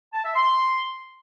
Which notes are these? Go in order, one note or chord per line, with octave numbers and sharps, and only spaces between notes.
A5
E5
C6